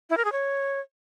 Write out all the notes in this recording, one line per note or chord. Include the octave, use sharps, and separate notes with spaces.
E4
A#4
G#4
C#5